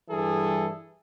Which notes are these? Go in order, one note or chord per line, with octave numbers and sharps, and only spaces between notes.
G2 E3 G3 G#4 A4